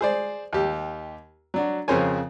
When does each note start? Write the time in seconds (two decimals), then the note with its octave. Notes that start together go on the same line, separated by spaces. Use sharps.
0.01 G#4 C5 D5
0.53 D#2 G4
1.54 F#3 D4 F#4
1.88 F2 C#3 A#4 C5 C#5 G#5